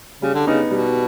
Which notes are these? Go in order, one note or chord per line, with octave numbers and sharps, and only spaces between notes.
C#3 G3
D3
C#3 B3 D#4
B2 G3